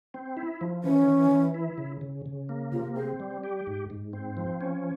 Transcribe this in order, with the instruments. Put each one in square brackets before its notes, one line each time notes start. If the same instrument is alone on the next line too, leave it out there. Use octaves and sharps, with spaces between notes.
[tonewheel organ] C4
E4
F3
[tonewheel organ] E3 [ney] C#4
[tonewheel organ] E3
E3
E4
C#3
C#3
C#3
A#3
[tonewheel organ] C3 [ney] F4
[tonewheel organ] C4 [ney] G#4
[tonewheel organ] G3
G4
G#2
G#2
C4
F3
C#4